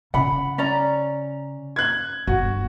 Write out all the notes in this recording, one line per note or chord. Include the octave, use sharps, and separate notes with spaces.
C#3 F#5 B5
C#4 D5 A#5
F#6 G#6
G1 F#4